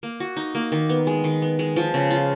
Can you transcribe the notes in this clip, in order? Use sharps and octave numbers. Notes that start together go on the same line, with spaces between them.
A#3
F#4
D#4
A#3
D#3
B3
G#3
D#3
B3
G#3
F3
C#3
F4